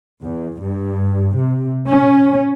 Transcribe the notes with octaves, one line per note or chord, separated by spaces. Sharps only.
E2
G2
C3
C#4